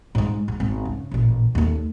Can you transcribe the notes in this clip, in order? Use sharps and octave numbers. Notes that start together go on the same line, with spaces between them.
G#2 G#3
G#2
G#1
C#3
A1 A#2
D#2 A3